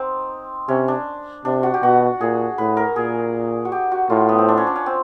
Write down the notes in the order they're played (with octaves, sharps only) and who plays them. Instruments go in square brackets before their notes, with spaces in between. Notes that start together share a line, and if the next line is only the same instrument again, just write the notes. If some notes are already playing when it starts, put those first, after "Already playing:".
Already playing: [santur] C4 D#4
[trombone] C3 [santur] C#4
[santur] D4
[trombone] C3 [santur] D4
[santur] F#4
G4
[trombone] B2 [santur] F#4
[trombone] A#2 [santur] G#4
[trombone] A2 [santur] B4
[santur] A#4
[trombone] A#2 [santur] G#4
[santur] F#4
G4
F#4
[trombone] A2 [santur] F4
[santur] B3
C4
D4
C#4
D4
C#4
C4